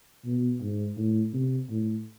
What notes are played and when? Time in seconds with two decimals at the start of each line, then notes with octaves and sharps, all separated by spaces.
0.25 B2
0.61 G#2
0.97 A2
1.33 C3
1.69 A2